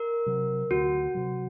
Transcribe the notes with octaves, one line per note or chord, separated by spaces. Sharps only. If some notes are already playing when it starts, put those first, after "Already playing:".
Already playing: A#4
C3 F#3
D2 F#4
C3 F#3